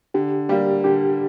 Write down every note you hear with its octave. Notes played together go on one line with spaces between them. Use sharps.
D3 G4
G3 A#3 G4
D3 G4